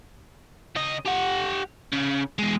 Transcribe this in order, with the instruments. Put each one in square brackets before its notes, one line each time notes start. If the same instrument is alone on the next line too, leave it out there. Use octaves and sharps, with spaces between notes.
[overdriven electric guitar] C#3 D#5
G4 F#5
C#3
E2 G#3